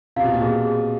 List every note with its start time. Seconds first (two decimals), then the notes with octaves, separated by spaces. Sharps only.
0.16 C3 F5
0.24 B2
0.33 A#2
0.41 B2 G#4
0.64 G#4